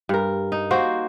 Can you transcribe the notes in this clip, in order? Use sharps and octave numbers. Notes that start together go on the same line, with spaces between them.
G2 A#4
D#4
A#3 F#4 C5